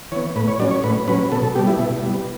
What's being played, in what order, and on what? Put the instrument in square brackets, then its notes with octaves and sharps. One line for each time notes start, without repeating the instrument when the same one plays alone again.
[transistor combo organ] E3 B3 C#5
A2 B4
C#5
F#3 C#4 D5
C#5
A2 B4
F#3 C#4 B4
B2 A4
A4
G3 B3 G4
E4
B2
G3 B3